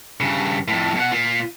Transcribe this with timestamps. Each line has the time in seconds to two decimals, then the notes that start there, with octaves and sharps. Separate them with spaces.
0.21 G2 C#3
0.68 F2 A2
0.95 B2 F#5
1.12 A#2 F4